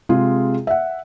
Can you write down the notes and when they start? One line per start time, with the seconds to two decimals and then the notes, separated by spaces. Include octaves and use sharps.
0.09 C3 G#3 F4 G#4
0.67 E5 F#5